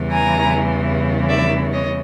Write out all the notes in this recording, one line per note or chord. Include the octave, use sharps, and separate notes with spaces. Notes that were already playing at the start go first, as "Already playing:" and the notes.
Already playing: E2 C#3 E3 G3
G#5 A#5
D5 E5
C#5 D#5